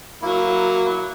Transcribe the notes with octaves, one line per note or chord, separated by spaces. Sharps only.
F#3 A#3 E4